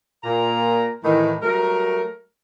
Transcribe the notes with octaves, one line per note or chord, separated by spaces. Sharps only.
A#2 A#4 A#5
A2 D#3 E3
F#3 G3 A3 A#4